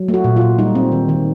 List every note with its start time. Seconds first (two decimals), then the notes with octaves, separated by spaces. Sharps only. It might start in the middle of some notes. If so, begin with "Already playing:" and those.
Already playing: F#3
0.08 A3
0.14 F#4
0.24 A#2
0.36 A#2 F4
0.59 G3 D#4
0.75 C4
0.92 D#3
1.09 D#3